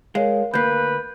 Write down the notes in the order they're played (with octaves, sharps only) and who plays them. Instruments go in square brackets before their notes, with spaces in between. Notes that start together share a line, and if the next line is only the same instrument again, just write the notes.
[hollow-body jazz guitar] G#3 [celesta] A#4 C#5 F5
[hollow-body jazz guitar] D2 A#3 [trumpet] B4 [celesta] G6